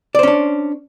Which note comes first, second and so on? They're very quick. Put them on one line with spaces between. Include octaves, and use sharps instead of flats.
D5 C5 C#4 D4